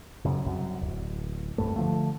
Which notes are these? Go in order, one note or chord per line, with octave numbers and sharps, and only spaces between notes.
F#2 C#3
C2 F#2
D1
C2 G2 A3
D3 F3 A3